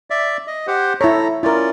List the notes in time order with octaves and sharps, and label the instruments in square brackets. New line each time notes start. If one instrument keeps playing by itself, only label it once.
[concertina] D5 E5
D#5
G4 C5 F#5
[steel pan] E4 C#5 [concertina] A4 A#5
[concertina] C#4 F4 D5 [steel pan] E4 A#4